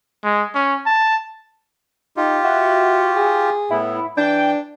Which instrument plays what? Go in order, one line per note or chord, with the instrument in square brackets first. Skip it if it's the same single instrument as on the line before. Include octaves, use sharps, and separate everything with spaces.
[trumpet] G#3
C#4
A5
[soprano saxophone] D#4 [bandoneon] F4 G4
[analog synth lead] F#4 [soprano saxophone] E5
[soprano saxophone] G#4
[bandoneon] A2 B3 [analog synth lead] E4
[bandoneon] E3 [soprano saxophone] D4 [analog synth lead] G5